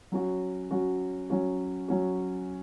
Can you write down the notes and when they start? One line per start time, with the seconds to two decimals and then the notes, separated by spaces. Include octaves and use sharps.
0.12 F#3 C#4 F#4
0.71 F#3 C#4 F#4
1.30 F#3 C#4 F#4
1.88 F#3 C#4 F#4